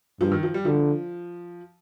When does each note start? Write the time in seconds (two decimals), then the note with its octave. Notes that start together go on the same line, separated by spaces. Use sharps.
0.20 G2 F3
0.32 D#3
0.43 F3
0.54 G3
0.65 D3 F3